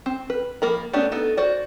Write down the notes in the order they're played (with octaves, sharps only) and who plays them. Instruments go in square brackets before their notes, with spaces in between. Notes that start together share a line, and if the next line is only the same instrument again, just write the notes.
[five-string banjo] C4
B4
F3 A#3 A#4 B5
A3 B3 C#4 D4 G4
B3 D#4 A4
F#4 C5 D5